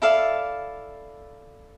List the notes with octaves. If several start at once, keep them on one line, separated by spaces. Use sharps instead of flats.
E4 A4 D5 F5